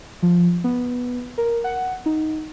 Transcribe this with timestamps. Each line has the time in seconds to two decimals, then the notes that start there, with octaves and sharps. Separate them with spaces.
0.23 F3
0.64 B3
1.38 A#4
1.64 F#5
2.06 D#4